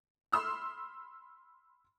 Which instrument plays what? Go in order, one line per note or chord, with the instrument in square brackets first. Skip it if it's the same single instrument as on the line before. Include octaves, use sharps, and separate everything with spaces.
[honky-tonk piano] B5 C6 E6 F6